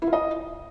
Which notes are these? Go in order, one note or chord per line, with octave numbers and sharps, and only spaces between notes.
E4
F4
D#5